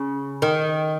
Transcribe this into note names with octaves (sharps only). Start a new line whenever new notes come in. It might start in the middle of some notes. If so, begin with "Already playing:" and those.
Already playing: C#3
D#3